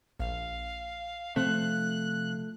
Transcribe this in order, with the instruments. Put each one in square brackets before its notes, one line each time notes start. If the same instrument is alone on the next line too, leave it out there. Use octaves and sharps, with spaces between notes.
[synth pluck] A#1 [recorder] F5
[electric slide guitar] C3 F3 F5 [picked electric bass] A3 [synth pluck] C4 C5 [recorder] F#6